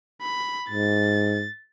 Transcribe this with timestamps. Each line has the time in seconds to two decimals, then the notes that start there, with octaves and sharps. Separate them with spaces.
0.22 B5
0.70 G#2 A6